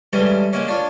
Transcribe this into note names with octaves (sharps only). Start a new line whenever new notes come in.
D3 E3 G3 G#3 C#4
C#3 G#3 A#3 C#4
D4 F4 C#5